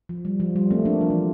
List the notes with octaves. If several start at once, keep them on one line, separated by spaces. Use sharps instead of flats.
F3
G3
F3
G3
A3 C4
A#3 D4
F3
E3